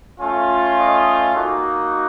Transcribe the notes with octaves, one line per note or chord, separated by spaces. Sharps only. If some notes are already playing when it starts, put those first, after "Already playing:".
A3 C#4 F4
D#5
A#3 D#4 F#4